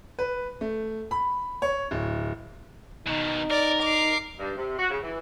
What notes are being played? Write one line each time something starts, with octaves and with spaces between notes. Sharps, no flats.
B4
A3
B5
C#5
D1
B2 D#3 D#4
A#4 D5
D6 C7
G2
C3
F#4
C#3
E3